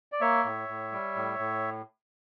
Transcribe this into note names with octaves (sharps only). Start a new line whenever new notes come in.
D5
A#3 C#5 E5
A2
A2
G3
A2
A2